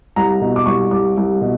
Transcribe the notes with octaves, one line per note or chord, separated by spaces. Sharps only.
C2 A#5
B2
D6
C2 C#6
C2 D6
C2
B2